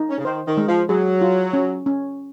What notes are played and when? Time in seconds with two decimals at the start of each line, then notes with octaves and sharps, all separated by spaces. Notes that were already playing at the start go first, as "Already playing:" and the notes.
Already playing: D#4
0.10 C#4
0.18 C#3
0.25 D#3 C5
0.47 D#3
0.57 G#3
0.68 F3
0.89 F#3 G#4
1.21 F4
1.53 C#4
1.86 C#4